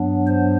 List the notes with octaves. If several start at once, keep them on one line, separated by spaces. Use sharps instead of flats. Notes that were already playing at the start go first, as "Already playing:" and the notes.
Already playing: G2 F#3 B3 D4
C5